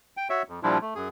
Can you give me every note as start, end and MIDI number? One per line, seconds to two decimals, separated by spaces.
0.17 0.28 79
0.30 0.42 66
0.30 0.42 73
0.30 0.42 76
0.48 0.60 41
0.63 0.78 46
0.63 0.78 53
0.63 0.78 55
0.63 0.78 62
0.63 0.78 64
0.63 0.78 65
0.81 0.94 57
0.95 1.08 42
0.95 1.08 68